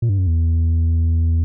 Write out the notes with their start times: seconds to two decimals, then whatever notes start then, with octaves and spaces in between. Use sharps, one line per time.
0.02 A#2
0.09 G2
0.18 F#2
0.27 E2